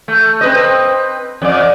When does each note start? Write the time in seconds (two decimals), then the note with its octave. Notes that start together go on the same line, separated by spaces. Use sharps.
0.08 A3
0.41 C4 B4 D#5
1.42 F2 D5